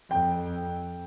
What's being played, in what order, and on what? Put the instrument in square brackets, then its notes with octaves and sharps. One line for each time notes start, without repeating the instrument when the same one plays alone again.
[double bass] F2 [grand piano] G5